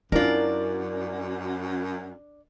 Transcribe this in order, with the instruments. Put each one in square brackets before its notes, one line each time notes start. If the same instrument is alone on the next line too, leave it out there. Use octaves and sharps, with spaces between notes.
[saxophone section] F#2 [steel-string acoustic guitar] D4 D5 [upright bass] E4 [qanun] F4 A#4